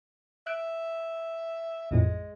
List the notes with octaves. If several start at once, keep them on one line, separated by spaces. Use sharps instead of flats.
E5 F#6 D7
A1 F2 A2 G#3